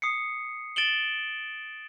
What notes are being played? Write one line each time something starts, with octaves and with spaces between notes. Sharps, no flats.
D#6 C7 C#7
A6 D7 E7 F#7 G7